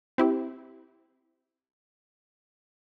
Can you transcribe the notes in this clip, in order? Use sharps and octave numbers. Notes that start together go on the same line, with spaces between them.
C4 E4 G4